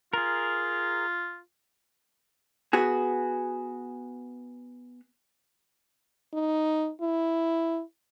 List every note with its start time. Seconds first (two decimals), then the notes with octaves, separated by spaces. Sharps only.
0.13 F4 G#4 A#4
2.73 B3 F#4 G#4
6.34 D#4
7.01 E4